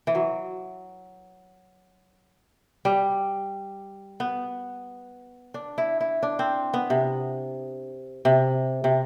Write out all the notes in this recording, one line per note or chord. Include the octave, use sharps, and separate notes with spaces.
E3
F#3
G3
B3
D4
E4
E4
D4
C4
B3
C3
C3
C3